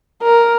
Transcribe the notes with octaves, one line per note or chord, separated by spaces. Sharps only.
A#4